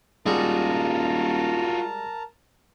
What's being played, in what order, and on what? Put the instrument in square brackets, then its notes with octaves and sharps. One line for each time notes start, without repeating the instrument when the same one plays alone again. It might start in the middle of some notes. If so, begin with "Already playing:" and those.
[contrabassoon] D#1 [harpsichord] G3 G#3 [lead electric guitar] F4 F#4 [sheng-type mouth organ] A#4 A5 A#5